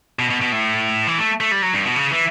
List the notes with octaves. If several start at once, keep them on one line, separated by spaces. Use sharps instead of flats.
B2
B2
B2
A2
E3
A3
A3
G3
F#3
G2
B2
C#3
E3